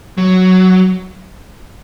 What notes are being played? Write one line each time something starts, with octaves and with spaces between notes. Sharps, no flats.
F#3